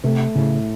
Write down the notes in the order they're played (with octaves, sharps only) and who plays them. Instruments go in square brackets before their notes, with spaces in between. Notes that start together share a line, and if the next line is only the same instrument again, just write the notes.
[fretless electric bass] C3 [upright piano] A3
[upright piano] A2 [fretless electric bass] C#3